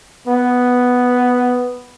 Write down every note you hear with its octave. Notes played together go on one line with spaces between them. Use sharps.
B3